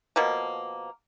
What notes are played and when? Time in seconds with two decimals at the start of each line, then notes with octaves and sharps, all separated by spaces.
0.16 B2 F3 A#3